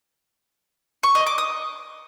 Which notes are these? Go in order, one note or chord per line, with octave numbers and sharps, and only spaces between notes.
C#6
D#5
D6
D#6